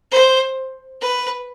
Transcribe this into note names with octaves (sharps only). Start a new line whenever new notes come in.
C5
B4